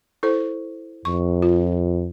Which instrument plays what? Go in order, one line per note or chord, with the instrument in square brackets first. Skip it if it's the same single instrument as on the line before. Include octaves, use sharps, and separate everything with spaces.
[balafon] E4 A4 C5
[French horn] F2 [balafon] C#6
[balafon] F4